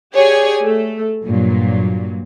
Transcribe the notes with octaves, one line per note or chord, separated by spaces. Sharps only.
G4 G#4 C#5 D5 G#5
A3
G2 A#2 F#3